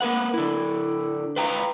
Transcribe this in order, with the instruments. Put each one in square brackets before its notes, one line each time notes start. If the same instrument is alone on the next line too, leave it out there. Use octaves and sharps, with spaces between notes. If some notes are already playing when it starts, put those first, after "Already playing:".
[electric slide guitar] A#3 A#4 B4 F#5
D3 E4
B4 F5 G5 A#5